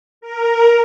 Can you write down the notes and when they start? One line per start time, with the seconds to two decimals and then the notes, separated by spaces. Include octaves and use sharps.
0.21 A#4